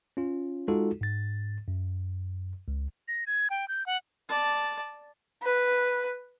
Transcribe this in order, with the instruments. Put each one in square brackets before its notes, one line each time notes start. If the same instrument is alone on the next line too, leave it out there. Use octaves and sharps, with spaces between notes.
[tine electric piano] C#4 F4
G#3 D#4 F4 F#4 A4
G#2 A6
F#2
C#2
[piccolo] A#6
G#6
G5
G6
F#5
[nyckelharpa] D5 A5
[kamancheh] B4